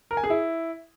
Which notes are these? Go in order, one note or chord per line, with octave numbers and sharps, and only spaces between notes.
A#4
G#5
G#4
E4